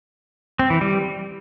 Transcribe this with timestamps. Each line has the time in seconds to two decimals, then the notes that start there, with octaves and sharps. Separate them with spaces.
0.59 C4
0.70 E3
0.81 G3